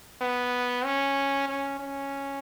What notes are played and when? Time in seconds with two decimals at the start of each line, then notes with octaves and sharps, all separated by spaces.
0.21 B3
0.85 C#4
1.48 C#4
1.79 C#4